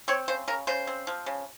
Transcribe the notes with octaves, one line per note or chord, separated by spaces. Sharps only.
C4 C#5
C#3 C5
C#3 A#4
C#3 C5
C4
F3
C#3